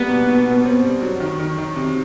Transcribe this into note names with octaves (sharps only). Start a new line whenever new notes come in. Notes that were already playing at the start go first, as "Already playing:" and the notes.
Already playing: G3 A#3 B3
B2
B2
B2
C4
G3
F#3
D#3
D#3
D#3
C3